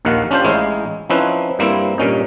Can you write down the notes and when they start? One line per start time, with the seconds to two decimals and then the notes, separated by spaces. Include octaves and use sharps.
0.05 A#1 D#2 D#3 F5 F#5
0.31 C#4 D4 F4 G4 C5
0.44 A1 G#3 D#4 E4 C#5 F5
1.10 F3 C4 C#4 D#4 E4 B4
1.59 G2 G3 A#3 C4 E4
1.98 G2 A#2 C#4 D#4